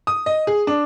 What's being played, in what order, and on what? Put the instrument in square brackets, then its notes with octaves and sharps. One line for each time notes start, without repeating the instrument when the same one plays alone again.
[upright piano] D#6
D#5
G#4
D4